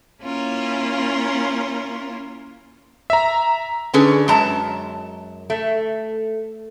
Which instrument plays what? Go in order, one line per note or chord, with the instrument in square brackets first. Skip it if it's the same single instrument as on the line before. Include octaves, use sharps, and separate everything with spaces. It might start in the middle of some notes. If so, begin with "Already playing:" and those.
[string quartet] A#3 C#4 E4 F4 A#4
[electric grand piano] E5 A#5
[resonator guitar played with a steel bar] D3 C#4 G#4 B4
F#2 G#3 A5 A#5
A3